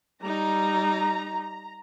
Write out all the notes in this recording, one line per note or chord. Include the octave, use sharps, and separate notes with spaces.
G3 D#4 A#5